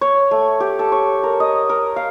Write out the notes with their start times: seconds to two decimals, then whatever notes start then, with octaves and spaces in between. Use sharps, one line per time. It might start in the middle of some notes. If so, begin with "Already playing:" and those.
0.01 C#5
0.31 A3
0.60 G4
0.79 A4
0.92 C#5
1.23 A#4
1.40 D#5
1.69 A#4
1.96 F5